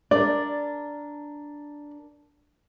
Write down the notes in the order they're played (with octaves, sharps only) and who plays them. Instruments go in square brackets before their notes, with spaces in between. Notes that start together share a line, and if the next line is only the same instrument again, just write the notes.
[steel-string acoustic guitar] D4 A#4 [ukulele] D5